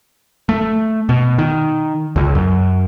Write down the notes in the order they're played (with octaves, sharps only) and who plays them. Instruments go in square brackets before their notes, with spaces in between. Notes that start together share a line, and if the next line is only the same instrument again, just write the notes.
[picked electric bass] A3
B2
D#3
C#2
F#2